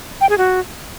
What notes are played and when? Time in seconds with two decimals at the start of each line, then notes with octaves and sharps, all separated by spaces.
0.21 G5
0.29 G#4
0.38 F#4